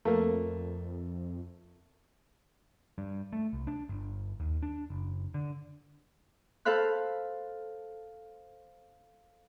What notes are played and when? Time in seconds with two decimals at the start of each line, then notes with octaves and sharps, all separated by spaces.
0.05 F2 A3 A#3
2.98 G2
3.33 A3
3.53 C2
3.67 D4
3.89 G1
4.40 D#2
4.63 D4
4.90 F#1
5.34 D3
6.65 A4 C5 F5 B5 F#6